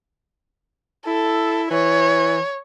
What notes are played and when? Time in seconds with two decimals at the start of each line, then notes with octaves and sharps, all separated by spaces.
1.07 E4 A4
1.71 E3 C#5